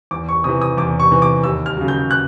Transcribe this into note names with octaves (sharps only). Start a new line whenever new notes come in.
E2 D6
C#6
C3 E3 D#6
D#6
E2 D6
C#6
C3 E3
D6
D#2 E6
F6
C#3 F#3
G6
F#6